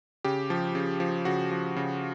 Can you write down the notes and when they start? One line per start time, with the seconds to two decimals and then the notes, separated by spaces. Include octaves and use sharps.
0.24 C#3 G4
0.50 F3
0.75 C#3
1.00 F3
1.25 C#3 F#4
1.51 F3
1.76 C#3